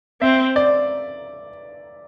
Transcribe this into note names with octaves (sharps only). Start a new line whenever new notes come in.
C4 E5
D5